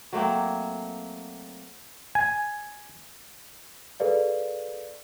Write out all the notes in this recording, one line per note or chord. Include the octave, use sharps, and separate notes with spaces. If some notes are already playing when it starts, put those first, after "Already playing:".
F#3 A3 A#3 C4
G#5
G#4 A4 B4 D5 F5